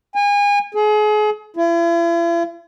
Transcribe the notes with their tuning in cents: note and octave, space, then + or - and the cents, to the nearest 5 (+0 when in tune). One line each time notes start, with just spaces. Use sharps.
G#5 -30
G#4 +35
E4 +45